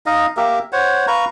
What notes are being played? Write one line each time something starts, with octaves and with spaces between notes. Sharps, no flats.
D#4 D#5 F5
A#3 G4 A#4 E5
C5 C#5 F#5
B4 F5 A#5 C#6